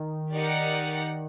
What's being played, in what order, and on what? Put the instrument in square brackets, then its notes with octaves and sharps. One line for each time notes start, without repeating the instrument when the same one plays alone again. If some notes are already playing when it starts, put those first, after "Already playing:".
Already playing: [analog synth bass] D#3
[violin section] D#4 G4 A#4 D5 F#5